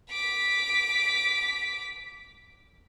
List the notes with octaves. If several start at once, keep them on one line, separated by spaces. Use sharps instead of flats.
D6 B6